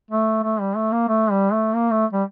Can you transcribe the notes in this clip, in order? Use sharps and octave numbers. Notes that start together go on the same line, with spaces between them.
A3
A3
G3
A3
A#3
A3
G3
A3
A#3
A3
G3